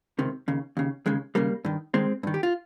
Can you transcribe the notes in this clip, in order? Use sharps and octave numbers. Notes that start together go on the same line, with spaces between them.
C#2 C3 D#3
D#2 C#3
D#2 C#3
D#2 C#3 G#3
D#2 C#3 G3 A#3
G2 D#3
G2 D#3 G#3 C4
G2 D#3
G4
F4